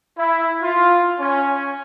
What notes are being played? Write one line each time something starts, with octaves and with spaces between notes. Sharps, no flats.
E4
F4
C#4